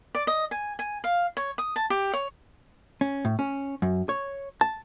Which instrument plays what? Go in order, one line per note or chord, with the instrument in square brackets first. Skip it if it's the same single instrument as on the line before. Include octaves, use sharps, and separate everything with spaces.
[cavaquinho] D5
D#5
G#5
G#5
F5
C#5
D#6
A5
G4
C#5
[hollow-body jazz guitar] C#4
A2
C#4
F#2
C#5
A5